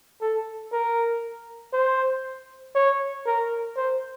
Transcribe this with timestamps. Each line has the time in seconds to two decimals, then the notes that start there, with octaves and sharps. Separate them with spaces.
0.21 A4
0.72 A#4
1.73 C5
2.75 C#5
3.26 A#4
3.76 C5